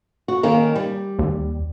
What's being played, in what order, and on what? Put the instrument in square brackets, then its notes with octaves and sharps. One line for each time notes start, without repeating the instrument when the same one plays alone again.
[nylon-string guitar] F#4
D#3 A#3 C#4
G3
[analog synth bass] D#2